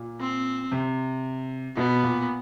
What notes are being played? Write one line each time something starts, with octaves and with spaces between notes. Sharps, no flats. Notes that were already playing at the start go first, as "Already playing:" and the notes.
Already playing: A#2
C4
C3
B2 B3
A#2